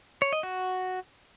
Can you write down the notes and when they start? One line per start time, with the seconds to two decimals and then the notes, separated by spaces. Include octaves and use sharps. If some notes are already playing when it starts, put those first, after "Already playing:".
0.22 C#5
0.33 D#5
0.43 F#4